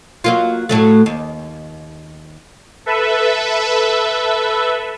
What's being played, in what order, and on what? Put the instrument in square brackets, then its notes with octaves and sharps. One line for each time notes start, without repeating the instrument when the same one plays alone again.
[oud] F#3 A#3 F4
A2 F#3 A3
D#2
[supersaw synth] A4 B4 E5